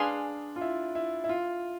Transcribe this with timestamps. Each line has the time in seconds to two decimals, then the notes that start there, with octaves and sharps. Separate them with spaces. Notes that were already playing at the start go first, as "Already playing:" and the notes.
Already playing: D4 G#4 B4 F5 G#5 C6
0.56 F4
0.61 E4
0.95 E4
1.24 E4
1.29 F4